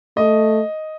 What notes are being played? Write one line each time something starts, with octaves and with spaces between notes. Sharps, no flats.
A3 D#5